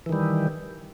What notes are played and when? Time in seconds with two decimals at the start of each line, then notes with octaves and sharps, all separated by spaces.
0.06 E3
0.09 D#3
0.13 G3